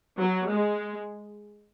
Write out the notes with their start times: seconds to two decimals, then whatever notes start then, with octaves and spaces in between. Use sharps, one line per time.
0.19 F#3
0.51 G#3